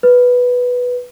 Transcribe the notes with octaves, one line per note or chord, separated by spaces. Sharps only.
B4